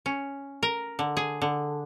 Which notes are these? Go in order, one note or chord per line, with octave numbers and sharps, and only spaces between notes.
C#4
A#4
D3
G#4
D3